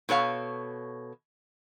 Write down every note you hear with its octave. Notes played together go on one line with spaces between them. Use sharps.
B2 A4 C#5 F5